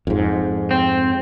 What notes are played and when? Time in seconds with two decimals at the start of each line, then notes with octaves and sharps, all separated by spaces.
0.07 F2 G#2
0.71 C4